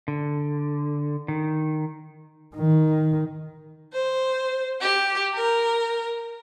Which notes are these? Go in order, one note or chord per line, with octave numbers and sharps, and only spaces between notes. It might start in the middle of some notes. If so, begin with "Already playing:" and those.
D3
D#3
D#3
C5
G4
A#4